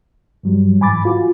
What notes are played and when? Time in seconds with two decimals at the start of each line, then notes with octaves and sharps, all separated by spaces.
0.43 G2 F#3 G3
0.80 G#2 E3 G#5 B5 D6 A6
1.05 F4 F#4